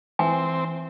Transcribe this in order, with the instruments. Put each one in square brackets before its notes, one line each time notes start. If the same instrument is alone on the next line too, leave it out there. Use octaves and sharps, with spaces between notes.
[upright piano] E3 [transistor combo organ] C4 [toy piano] G#5